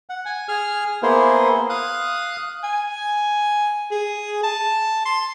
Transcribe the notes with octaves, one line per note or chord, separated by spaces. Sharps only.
F#5
G#5
G#4 F6
A#3 B3 E4 G#4 C5
F5 D#6 F#6
G#5
G#4
A5
C6